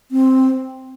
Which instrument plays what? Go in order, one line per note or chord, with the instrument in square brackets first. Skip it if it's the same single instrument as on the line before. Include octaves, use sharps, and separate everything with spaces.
[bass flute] C4